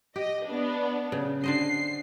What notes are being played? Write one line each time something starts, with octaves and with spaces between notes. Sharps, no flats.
G4 D#5
B3 D4
C#3
D3 C5 D#5 C7